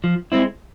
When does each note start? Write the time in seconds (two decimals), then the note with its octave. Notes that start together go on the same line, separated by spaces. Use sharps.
0.04 F3
0.32 G#3 C4 E4